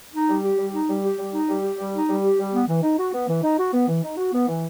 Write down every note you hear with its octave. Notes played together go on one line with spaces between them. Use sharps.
D#4
G3
G4
G3
D#4
G3
G4
G3
D#4
G3
G4
G3
D#4
G3
G4
G3
B3
E3
D#4
F#4
B3
E3
D#4
F#4
B3
E3
D#4
F#4
B3
E3